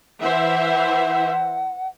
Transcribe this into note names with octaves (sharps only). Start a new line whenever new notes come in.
E3 C5 E5 F#5